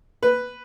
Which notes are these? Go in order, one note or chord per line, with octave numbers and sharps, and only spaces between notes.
B4